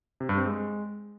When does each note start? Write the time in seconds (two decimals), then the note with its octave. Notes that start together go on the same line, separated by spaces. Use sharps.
0.20 C3
0.29 G2
0.37 C4
0.46 G#3